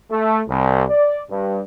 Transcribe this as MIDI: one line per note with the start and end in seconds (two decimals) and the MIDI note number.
0.10 0.39 57
0.48 0.83 36
0.90 1.22 74
1.30 1.60 43